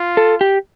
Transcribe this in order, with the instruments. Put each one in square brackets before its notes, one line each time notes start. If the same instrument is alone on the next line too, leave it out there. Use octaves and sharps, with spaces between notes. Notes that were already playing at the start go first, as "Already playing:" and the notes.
Already playing: [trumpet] F4
[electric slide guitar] A4
G4